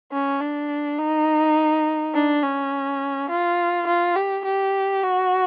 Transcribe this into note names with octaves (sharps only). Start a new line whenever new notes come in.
C#4
D4
D#4
D4
C#4
F4
F4
G4
G4
F#4